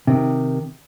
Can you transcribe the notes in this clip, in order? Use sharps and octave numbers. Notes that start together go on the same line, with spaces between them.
C3 D#3